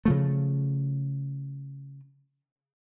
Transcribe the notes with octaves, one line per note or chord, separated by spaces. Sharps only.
C#3 F3 A3